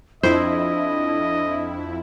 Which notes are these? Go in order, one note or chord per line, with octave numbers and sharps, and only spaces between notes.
F2 D4 E4 C5 D#5